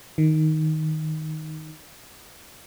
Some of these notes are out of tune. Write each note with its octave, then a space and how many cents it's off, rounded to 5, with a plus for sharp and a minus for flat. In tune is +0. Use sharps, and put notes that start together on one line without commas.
D#3 +5